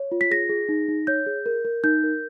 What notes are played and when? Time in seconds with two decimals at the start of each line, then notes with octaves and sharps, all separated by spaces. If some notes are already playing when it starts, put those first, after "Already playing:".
Already playing: C#5
0.12 F4
0.21 B6
0.31 G#4 A#6
0.50 G#4
0.69 D#4
0.88 D#4
1.07 C#5 G6
1.26 G#4
1.46 A#4
1.65 A#4
1.84 D#4 G6
2.04 A#4